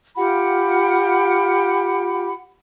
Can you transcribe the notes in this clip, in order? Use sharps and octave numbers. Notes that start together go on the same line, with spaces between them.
F4 G4 F#5 B5